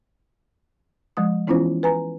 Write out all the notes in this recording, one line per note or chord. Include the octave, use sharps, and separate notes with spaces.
F3 G#3 D#6
E3 B3 C#4 E4 F4 C5
B4 G#5 A#5